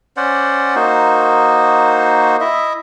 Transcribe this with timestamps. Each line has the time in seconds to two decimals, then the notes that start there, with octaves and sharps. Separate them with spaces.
0.17 C#4 C5 D5 F#5
0.75 A#3 D#4 F#4 C5
2.41 E4 D#5 E5